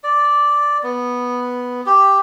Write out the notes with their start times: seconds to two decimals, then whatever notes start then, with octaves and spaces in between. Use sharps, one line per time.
0.04 D5
0.83 B3
1.86 G4